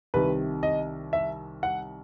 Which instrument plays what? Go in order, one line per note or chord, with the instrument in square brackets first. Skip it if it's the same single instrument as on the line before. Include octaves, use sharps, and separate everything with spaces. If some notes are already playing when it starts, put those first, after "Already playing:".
[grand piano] C2 C3 D#3 B4
D#5
E5
F#5